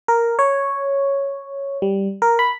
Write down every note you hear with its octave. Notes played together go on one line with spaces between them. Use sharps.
A#4
C#5
G3
A#4
B5